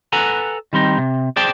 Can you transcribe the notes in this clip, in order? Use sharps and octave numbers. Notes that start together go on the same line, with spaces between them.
A4 B4 F#5 G#5 A#5
D#3 G3 C4 D#4
C3
G#4 C5 D5 G5 A5